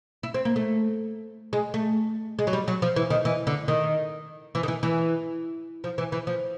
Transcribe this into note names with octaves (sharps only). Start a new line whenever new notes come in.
E4
C4
A#3
A3
G#3
A3
G#3
F#3
G3
F#3
F3
E3
D#3
E3
D3
D#3
E3
D#3
E3
E3
F3
E3
E3
F3